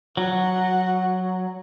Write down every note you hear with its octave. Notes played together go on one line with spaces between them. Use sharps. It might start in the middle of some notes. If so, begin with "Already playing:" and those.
F#3 F#5